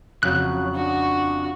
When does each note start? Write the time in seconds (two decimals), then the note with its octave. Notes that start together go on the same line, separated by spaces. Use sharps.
0.23 F2 C#3 F#3 F#6
0.75 D4 F#4